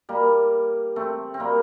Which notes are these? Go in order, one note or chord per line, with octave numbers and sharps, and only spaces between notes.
G3 A#3
A3 C4
C4
G3 A#3